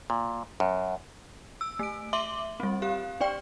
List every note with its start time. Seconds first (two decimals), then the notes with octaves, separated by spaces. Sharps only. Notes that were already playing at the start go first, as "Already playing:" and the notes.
0.10 A#2
0.60 F#2
1.61 E6
1.79 A3 D7
2.13 E5 C6 D6 F#7 G7
2.60 G3 C4
2.82 G4 F5
3.21 D4 D5 G5